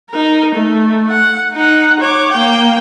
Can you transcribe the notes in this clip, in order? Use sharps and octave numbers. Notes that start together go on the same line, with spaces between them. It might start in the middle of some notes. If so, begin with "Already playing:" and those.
D#4 A#4
A3
F#5
D#4 F#5
C#5 D6
A#3 G5